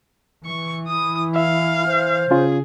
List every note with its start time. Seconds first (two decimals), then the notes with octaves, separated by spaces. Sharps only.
0.46 E3 C#6
0.87 E4 D#6
1.36 E5 F5
1.87 C5
2.31 C#3 C#4 F4 G#4